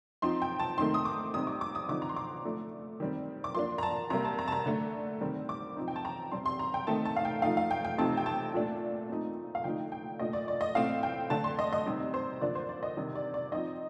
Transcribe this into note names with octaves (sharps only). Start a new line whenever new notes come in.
F3 C4 D#4 C6
G5
A5
D#3 A3 C4 D#4 C6
D#6
D6
C3 G3 C4 D#4 D#6
D6
D6
D#6
D3 F3 C4 D#4 D6
A#5
C6
D6
F3 A3 D4
D#3 G3 C4
D6
F3 A#3 D4 C6
A#5
A5
C3 G3 A#3 A#5
A5
A#5
A5
A#5
D3 A3 D4
D#3 G3 C4
D6
F3 C4 D#4
G5
A5
A#5
C3 G3 C4 C6
C6
A#5
G5
D#3 A3 C4 D#4 A5
A5
F5
G5
F3 A3 D#4 F5
F5
G5
G5
C3 F3 A3 C4 D#4 A5
G5
A5
A#2 A3 D4
A#2 A3 C4 D#4
F5
D3 F3 A3 D#4 G5
G5
A#2 A3 D4 D#5
D5
D5
D#5
A2 A3 C4 F5
G5
D3 A3 D4 A5
C6
D#5
D#5
C3 G3 C4 D#4
C5
D3 F3 A#3 D4 D5
C5
D5
D#5
C3 D#3 G3 D4
D5
D5
F3 C4 D#4 D#5